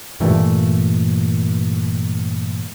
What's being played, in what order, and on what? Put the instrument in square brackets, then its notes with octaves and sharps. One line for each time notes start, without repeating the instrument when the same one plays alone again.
[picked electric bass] G2 A#2 E3 A3